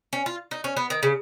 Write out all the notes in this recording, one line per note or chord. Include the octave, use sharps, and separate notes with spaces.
C#4
F4
D#4
C#4
B3
D#3
C#3